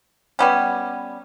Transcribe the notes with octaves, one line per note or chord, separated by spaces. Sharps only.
G3 B3 C#4